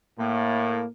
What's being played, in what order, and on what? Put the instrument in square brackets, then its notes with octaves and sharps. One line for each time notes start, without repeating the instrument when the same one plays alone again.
[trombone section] A2 [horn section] A#3